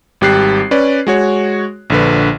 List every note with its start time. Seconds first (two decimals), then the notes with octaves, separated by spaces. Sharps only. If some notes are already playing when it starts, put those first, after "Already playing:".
0.21 G#1 G3 G4 F#6 C7
0.71 C#4 B4 D5
1.07 G#3 F#4 C#5
1.90 A#1 D3 B4